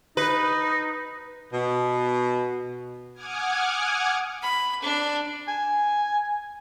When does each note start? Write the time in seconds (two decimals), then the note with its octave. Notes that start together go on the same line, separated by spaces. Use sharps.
0.17 D#4 B4
1.53 B2
3.13 F#5 G#5 D6 D#6 F6 G#6
4.42 B5
4.82 D4
5.48 G#5